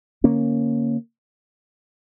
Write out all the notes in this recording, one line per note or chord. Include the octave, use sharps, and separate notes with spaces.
D3 A#3 C#4